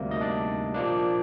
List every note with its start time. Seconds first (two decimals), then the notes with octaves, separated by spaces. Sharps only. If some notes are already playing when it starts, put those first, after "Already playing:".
Already playing: D2 C3 G3 A#3
0.11 D#4 D#5
0.21 D4 D5
0.75 A#2 F3 A#3 D4